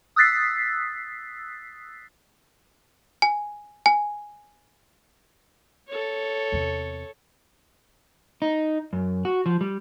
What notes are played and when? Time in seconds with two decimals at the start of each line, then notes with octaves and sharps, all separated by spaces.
0.16 D#6 E6 F#6 A6 B6 C7
3.22 G#5
3.86 G#5
5.88 A4 C#5
6.52 E2 C3
8.42 D#4
8.93 F#2
9.25 F#4
9.46 F3
9.61 G3